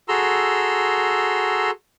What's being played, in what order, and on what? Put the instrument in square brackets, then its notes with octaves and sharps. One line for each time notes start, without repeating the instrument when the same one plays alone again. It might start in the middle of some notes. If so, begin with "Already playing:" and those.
[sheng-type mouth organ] F#4 G#4 A4 A#5 C6 E6